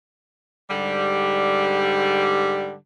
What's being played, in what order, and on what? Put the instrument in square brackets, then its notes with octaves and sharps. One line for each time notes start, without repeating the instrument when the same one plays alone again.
[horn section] G#2 D3 G3